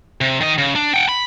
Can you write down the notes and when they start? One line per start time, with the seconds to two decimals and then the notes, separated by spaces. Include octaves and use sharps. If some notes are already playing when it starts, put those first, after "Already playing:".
0.21 C3
0.41 D#3 D#5
0.58 C#3
0.76 D4
0.94 F#5 G5
1.09 B5